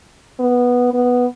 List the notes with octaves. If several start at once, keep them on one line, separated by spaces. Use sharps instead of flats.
B3
B3